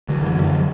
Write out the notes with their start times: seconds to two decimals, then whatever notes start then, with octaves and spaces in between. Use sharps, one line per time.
0.09 D3 F#3
0.22 F#2 E3
0.35 D3 F#3